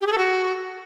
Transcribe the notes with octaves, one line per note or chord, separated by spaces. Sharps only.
G4
G#4
A4
F#4